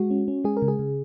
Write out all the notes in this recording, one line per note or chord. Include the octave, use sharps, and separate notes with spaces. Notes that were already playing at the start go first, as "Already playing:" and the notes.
Already playing: G#3 F#4
C#4
C#4
G#3 G#4
A#4
C#3
G#4
C#3